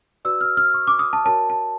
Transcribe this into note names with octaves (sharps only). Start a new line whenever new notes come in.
F#4 B4 D5 E6
F6
F6
C#6
D6
D#6
A5
F#4 A#4 C#5 A5
A5